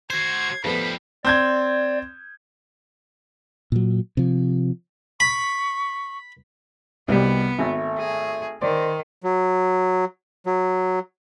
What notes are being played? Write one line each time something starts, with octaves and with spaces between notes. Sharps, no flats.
F#4 C5 G#6 C7
F2 F3 G3 A3 B3 B5
C4 D5 G6 G#6
A#2 F#3
C3 F3
B5 C#6
C2 B2 G3 B3
G#1 A3
G#4
D#3 C5 D5
F#3
F#3